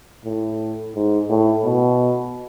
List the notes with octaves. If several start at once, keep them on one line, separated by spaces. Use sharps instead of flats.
A2
G#2
A2
B2